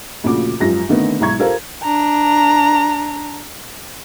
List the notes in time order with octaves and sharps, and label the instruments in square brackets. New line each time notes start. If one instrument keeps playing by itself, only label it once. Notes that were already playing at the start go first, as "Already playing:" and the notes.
[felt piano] D2 A#2 C#3 F3 F#4 D6
G#1 F#2 F3 F4 G4 A#6
D3 D#3 A3 B3 C4
B1 G#2 E4 A#5 C#6 G#6
F4 G4 A4 A#4 C5 F5
[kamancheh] D4 A#5